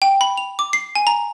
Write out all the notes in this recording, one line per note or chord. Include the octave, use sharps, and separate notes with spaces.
G5
B5
F7
D6
C7
G#5
A#5